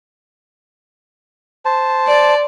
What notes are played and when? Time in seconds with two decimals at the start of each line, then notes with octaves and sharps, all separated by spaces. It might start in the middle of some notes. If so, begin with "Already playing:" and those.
1.65 C5 A5
2.07 D5